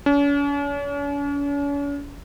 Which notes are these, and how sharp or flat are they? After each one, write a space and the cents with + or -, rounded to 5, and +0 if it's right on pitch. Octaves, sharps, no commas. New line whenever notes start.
C#4 +45